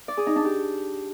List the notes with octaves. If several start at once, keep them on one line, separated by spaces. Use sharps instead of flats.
D5
G#4
D#4
D4
G4